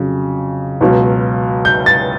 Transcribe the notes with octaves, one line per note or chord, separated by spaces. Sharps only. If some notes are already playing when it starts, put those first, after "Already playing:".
Already playing: F2 C#3 F#3
C#2 B2 F#3
G6
A6